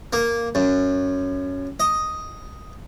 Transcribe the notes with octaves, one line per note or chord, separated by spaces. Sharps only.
A#3
F#2
D#5